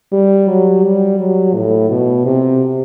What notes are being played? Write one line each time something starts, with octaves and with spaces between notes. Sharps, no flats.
G3
F#3
G3
F#3
A2
B2
C3